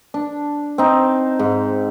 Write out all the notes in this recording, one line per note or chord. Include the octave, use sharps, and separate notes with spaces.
D4
C4 D#4
G#2